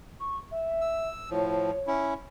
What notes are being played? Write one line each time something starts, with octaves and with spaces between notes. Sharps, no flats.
C#6
E5
E6
A2 F3 C#5
C#4 E4